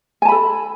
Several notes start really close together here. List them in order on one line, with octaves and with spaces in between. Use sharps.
G#5 A5 B5 A4